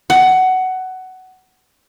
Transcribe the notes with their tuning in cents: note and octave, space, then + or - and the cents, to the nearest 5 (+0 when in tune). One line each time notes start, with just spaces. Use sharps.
F#5 +15